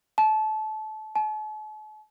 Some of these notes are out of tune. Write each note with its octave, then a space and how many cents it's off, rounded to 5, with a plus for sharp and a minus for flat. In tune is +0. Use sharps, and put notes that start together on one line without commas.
A5 -25
A5 -45